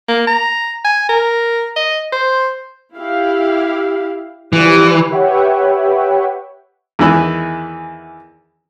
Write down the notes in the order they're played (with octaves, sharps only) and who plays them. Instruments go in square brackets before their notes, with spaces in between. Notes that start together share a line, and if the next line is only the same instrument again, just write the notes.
[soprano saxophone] A#3
A#5
G#5
A#4
D#5
C5
[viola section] E4 G4 F5
[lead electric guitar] E3 [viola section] F3 G3
[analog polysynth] G4 B4 C#5 E5 F#5 G5
[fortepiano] E2 D#3 E3 E4